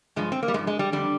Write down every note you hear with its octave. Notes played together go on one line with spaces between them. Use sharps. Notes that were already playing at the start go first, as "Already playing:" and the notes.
G2 F3 G#3
C4
A#3
G3
G2 F3 G#3
G#3
G3
F2 D3 G3